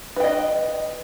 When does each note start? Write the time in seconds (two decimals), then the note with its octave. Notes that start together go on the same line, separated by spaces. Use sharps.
0.16 B4
0.20 G5
0.24 D#5